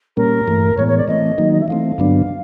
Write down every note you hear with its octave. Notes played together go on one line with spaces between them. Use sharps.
A#2 G3 A#3 C#4 A#4
G2 E3 A3
A2 E3 G#3 B3 C#5
C#5
D5
E3 A3 C4 D#5
D#3 F#3 A#3 D#4
D#5
E5
E3 A3 C4 F5
G2 D3 F#3 B3 D4